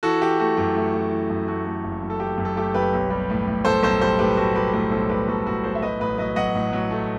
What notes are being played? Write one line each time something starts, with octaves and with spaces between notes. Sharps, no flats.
E3 F#4 A4
E3 G4
A3 F#4
F#2 G4
A3
A3
E3
F#2
A3 F#4
A3
F#1
F#2
A4
E3 G4
F#2
A4
A3 G4
F#1 G4 B4
B1
G3
A2
A2
A2 A4 C5
B1 A4 C5
G3 A4 C5
A2 G4 B4
A2 F#4 A4
G3 G4 B4
A2 G4 B4
B1 A4 C5
G3 G4 B4
B1 F#4 A4
A2 F#4 A4
B1 A4 C5
E5
F#3 B4 D#5
A1 B4 D#5
F#3 B4 D#5
F#3 D#5 F#5
A2
F#3
A3